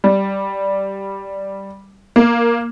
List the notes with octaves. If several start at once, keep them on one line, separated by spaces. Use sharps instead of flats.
G3
A#3